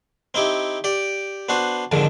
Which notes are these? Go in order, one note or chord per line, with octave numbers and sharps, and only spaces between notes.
C4 D#4 E4 G4
G4 D5
B3 D4 F#4 C5
F2 G#2 D3 D#3 F3